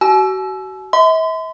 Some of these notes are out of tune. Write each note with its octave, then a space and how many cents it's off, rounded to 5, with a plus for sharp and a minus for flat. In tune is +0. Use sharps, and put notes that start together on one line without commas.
F#4 +35 G#5 +45 E6 +10
E5 -40 C6 -40